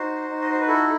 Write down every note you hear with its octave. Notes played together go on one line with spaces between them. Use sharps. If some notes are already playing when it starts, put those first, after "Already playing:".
Already playing: D#4 F#4 C5
D#4
D#5
C5
B4
E4 A4